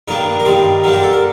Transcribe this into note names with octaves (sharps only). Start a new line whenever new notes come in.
G2 D#3 A#3 D4 A#4
A#4
G2 D#3 G3 C5
D3 G3 A#3 D4 A#4
G4
A4
A#4